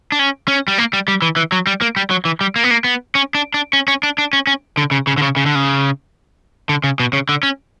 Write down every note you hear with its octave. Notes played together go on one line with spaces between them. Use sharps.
D4
C#4
C#4
G3
A#3
G3
G3
E3
E3
F#3
G3
A#3
G3
F#3
E3
G3
A#3
B3
A#3
B3
C#4
D4
D4
C#4
C#4
D4
D4
C#4
C#4
D3
C#3
C#3
D3
C#3
C#3
D3
C#3
D3
C#3
B2
C#3
D3
C#4